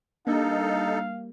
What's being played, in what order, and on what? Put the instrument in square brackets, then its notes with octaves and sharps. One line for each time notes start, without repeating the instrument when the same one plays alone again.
[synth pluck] G3 A#3 [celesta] D4 [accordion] D#4 A4 [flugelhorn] F5